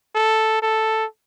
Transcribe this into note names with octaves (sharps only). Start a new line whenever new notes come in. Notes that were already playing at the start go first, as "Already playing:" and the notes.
A4
A4